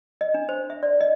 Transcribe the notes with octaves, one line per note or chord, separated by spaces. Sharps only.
D#5
D4
C5
E5
D5
D#5